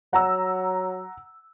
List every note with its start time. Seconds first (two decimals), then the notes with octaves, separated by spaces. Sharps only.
0.13 F#3 F#5 A#5 E6